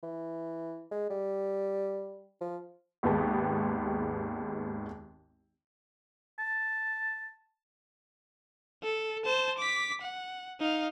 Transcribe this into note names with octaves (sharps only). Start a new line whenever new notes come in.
E3
G#3
G3
F3
G#1 D#2 G#3 B3 G4 A5
A5
A4
C5 A5
D6 B6
F#5
D#4 F5